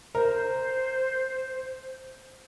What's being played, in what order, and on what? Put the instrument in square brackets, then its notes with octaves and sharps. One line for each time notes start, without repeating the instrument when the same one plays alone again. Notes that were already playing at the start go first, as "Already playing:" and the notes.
[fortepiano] A#4 [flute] C5